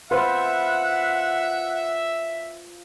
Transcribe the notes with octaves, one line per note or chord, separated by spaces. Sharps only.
F4 B4 C5 E5 F#5